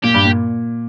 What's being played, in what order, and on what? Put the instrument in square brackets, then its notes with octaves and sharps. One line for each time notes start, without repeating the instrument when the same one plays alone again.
[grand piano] A#2 [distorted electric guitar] G4
[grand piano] G2
A#2